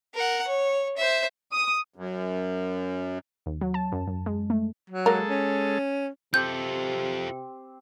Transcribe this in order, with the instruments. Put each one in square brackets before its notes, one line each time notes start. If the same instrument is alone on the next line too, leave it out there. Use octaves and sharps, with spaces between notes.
[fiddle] A#4 F#5
C#5
C5 E5
[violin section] D#6
[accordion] F#2
[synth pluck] D#2
F#3
A5
F#2
F#2
G#3
A3
[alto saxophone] F#3
[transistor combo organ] G#3 A4 [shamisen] A#3 A#4
[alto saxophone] C#4
[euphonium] C3 [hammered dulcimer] C4 G4 [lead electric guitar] F4 A4 [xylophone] G6